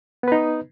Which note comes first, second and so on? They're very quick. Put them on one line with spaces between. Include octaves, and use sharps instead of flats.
B3 B4 D#4